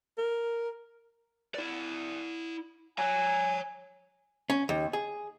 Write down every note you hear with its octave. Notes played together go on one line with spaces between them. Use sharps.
A#4
E4 D5
C#5 G#5 A#5
C#4
D#2
G#4